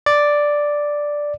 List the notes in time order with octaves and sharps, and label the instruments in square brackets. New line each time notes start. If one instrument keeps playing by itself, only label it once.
[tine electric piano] D5